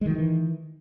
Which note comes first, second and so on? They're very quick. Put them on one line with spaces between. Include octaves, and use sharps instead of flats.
G#3 D#3 F#3 E3